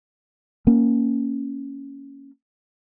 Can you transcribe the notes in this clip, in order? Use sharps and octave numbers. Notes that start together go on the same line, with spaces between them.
A#3 C#4